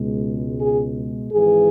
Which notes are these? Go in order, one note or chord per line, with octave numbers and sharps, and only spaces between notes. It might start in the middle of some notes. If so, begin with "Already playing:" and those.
Already playing: C#2 B2 G#3
G#4
G#1 G#2 E3 G#4